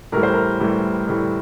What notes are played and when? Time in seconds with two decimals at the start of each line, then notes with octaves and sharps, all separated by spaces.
0.12 A2 E3 G3 A#4
0.23 C5
0.34 A#4
0.60 A2 E3 G3
1.08 A2 E3 G3